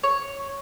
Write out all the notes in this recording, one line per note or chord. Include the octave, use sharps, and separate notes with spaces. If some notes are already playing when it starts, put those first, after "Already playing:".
C#5